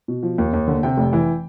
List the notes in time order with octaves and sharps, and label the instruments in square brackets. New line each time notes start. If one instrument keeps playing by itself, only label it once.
[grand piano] B2
F3
D#2
D#2
D3
C3 G5
F1
E3